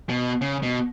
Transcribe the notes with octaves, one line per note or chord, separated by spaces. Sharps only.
B2
C#3
B2